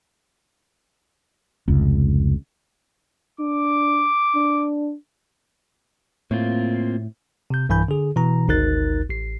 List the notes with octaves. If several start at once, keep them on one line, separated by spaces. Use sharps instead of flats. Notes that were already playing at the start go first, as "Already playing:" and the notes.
F1 C#2
D4 D6
D4
A2 A#3 C4 F4
C3 G6
B1 G2 E3 G#5 B5 G6
D3 G#4
B2 E3 A#5
G#1 D2 D#4 A#4 F#6 A6
A1 C7